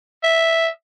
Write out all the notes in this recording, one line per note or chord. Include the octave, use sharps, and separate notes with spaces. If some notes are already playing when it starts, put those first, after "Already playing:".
E5